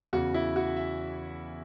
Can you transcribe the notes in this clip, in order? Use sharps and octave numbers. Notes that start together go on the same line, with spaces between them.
E2 C#3 E3 F#4
E4
F#4
E5